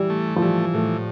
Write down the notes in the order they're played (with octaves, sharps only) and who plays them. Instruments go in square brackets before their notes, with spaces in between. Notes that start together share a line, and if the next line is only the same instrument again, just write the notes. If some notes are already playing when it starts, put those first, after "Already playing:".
Already playing: [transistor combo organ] E3 [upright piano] G3
[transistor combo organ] A3
[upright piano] F3
[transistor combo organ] E3 [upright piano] G3
[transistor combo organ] A2 [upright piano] A3